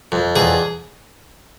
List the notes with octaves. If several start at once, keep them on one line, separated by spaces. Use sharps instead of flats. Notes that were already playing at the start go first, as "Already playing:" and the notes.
F2
E2 G#4